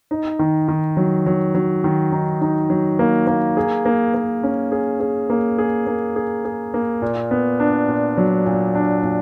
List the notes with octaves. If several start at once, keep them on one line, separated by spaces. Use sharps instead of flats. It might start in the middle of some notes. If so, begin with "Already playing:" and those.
D#4
D#3
D#3
F#3
F#3
F#3
D#3
D#4
D#4
F#3
A#3
A#3
G#4
A#3
A#3
C#4
G#4
G#4
A#3
G#4
A#3
G#4
G#4
A#3
A#2
B3
D4
A#2
F#3
A#2
D4
A#2